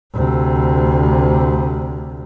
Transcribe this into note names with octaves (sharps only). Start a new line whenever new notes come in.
D2 C3